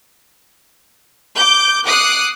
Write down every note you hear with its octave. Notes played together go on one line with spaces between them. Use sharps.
D6 G6
D6 D#6 F#6 C7 C#7